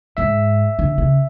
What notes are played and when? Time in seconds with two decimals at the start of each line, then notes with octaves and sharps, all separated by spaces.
0.17 G#2 E5
0.79 D3
0.98 C#3